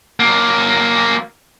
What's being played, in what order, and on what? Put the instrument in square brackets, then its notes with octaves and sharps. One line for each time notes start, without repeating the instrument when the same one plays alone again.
[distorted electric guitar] F#3 A#3